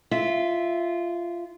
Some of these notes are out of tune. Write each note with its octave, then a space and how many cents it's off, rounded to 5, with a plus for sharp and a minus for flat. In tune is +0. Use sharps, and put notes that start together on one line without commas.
F4 -15 E5 +0